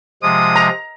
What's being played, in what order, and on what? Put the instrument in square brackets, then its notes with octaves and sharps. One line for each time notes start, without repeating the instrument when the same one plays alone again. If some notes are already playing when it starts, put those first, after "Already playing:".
[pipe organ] C3 F3 G#3 [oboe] D#6
[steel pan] A#5